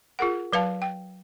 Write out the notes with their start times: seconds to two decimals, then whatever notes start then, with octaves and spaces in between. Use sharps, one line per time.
0.19 F4 G#4 A#4 F#5
0.53 F#3 B4 F5 A5
0.82 G5